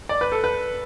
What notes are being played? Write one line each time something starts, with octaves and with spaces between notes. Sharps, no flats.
D5
B4
A4
B4